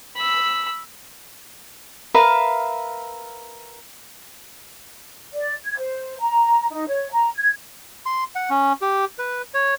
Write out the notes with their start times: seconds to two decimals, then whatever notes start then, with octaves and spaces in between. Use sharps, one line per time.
0.16 B5 E6
2.14 A#4 B4 E5 F5
5.32 D5
5.65 G#6
5.77 C5
6.19 A#5
6.70 D#4
6.88 C#5
7.11 A#5
7.36 G#6
8.06 C6
8.35 F#5
8.50 C#4
8.82 G4
9.19 B4
9.54 C#5